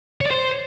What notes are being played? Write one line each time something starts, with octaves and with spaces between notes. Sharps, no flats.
C#5
D5
C5